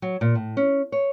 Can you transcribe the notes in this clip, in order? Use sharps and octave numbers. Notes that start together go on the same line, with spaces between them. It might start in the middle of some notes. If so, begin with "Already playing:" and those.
F#3
A#2
A2
C#4
C#5